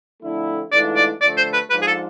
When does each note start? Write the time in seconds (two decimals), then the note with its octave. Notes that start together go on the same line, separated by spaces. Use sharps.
0.23 F2 D3 A3 E4
0.72 G#2 E3 A3 D4 F4 D5
0.96 D5
1.21 D3 F3 A3 D5
1.37 C5
1.54 B4
1.70 G#2 F3 G#3 D4 F4 B4
1.82 G#4
1.87 A4